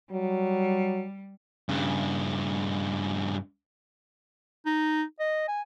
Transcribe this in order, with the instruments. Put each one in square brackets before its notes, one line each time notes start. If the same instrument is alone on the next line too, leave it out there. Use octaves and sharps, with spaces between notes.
[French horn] F#3 [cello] G3
[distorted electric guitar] G2 C#3
[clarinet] D#4
D#5
G#5